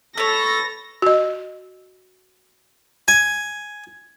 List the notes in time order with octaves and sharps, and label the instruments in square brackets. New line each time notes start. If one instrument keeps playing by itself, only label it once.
[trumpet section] A4 [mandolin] B4 C#5 [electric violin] A#6
[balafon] F#4 D#5
[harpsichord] G#5